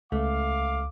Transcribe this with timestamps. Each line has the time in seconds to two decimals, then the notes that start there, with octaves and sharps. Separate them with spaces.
0.12 C#2 A3 F5 D6